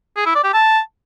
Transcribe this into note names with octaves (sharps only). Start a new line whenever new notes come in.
G#4
E4
D5
G4
A5